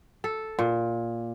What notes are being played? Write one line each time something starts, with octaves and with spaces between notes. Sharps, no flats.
A4
A#2